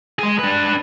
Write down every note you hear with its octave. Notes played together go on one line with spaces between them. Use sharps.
G#3 G#4
D4 B4